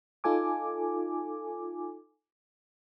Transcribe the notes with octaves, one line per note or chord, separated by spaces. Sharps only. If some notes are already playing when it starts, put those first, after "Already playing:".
D#4 F4 A4 G#5 D6